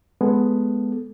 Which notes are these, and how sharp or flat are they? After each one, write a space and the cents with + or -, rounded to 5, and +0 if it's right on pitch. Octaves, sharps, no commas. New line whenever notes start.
G#3 +15 B3 +0 A4 +0